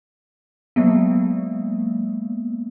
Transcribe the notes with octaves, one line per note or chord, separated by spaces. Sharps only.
F#3 G#3 A#3 B3